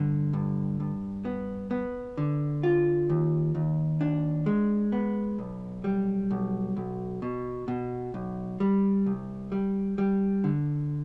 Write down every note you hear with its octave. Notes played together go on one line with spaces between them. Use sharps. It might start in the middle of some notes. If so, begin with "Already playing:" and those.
Already playing: G2 D3
G2
G2
B3
B3
D3
F4
D#2
D#2
D4
G#3
B3
B1
G3
B1
B1
B2
B2
B1
G3
C2
G3
G3
D3